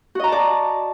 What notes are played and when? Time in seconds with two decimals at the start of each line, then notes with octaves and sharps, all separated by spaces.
0.15 F#4
0.19 D#5
0.24 A#5
0.28 A5
0.32 D5